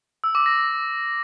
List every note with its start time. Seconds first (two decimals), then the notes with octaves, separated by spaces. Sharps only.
0.24 E6
0.35 D6
0.46 A#6